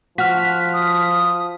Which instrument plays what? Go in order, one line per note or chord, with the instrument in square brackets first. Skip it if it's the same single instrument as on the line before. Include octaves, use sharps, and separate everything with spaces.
[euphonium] F3 [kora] F#4 [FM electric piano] F6 B6
[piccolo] D#6